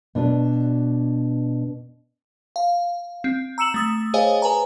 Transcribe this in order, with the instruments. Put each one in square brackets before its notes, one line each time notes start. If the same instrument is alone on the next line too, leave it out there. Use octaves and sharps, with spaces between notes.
[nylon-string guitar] B2 D4 B4 D5
[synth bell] F5
C4
A#5 E6 C#7 E7 F#7
A3 D#6 A6
G#4 C5 C#5 D#5 F5 G#5
B4 G#5 A#5